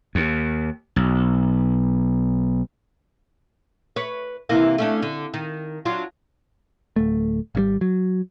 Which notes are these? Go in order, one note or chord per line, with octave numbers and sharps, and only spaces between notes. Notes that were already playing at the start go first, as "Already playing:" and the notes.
D#2
B1
B4 C#5
C3 E3 A#3
A3 C#4 D4
D3
D#3
F#3 D4 F4
D1 A3
G#1 C#3 G3
F#3